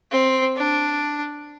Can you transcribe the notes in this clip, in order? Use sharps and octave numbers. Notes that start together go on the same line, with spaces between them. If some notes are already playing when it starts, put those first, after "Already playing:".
C4
D4